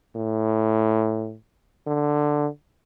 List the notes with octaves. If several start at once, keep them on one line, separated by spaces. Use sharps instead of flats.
A2
D3